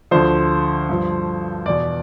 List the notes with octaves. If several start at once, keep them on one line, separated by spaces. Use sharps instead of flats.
D2 D3 F3 C5
G2 F3
E2 B2 D5